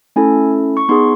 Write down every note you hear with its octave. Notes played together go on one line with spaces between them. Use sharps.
A3 C#4 E4 A4 G#5
C#6
B3 D#4 G#4 C6